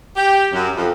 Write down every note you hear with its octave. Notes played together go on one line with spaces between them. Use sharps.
G4
F#2
F2